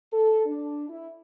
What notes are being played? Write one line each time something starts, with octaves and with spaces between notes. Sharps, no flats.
A4
D4
E4